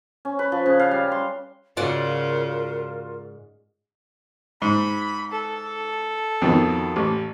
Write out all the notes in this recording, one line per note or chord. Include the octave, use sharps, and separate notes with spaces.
C#4
B4
F3
C#3
F5
G3
C6
G#2 C#3 F4 F#4 A#4 D5 F#5
G#2 B5
A4
F2 B2 D#3
A1